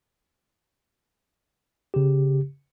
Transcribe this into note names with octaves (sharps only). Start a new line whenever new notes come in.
C#3 G4